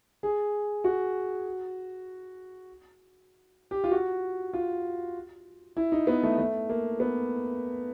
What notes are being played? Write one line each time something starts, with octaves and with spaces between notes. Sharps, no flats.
G#4
F#4
G4
F4
F#4
F4
E4
D#4
B3
A3
A3
A#3
B3